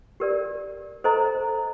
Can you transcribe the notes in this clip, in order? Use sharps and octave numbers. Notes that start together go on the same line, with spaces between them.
G4 A#4 D5
A4 C5 D#5 A#5